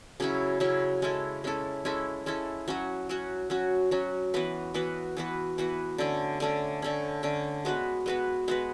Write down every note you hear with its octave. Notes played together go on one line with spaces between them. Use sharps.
C#3 F#3 C#4 E4
C#3 F#3 C#4 E4
G#3 C#4 E4 A4
G#3 C#4 E4 A4
G#3 C#4 E4 A4
G#3 C#4 E4 A4
F#3 C#4 F#4
F#3 C#4 F#4
F#3 C#4 F#4
F#3 C#4 F#4
E3 B3 F#4 B4
E3 B3 F#4 B4
E3 B3 F#4 B4
E3 B3 F#4 B4
D3 A3 C#4
D3 A3 C#4
D3 A3 C#4
D3 A3 C#4
G#3 B3 F#4 B4
G#3 B3 F#4 B4
G#3 B3 F#4 B4